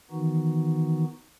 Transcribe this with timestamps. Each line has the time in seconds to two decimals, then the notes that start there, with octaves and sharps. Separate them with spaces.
0.11 D#3 E3 B3 D#4 F#4